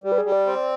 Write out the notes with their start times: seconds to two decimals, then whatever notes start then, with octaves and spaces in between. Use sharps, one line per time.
0.04 G3 G4
0.12 B4
0.18 G#4
0.25 G3
0.32 D5
0.46 C4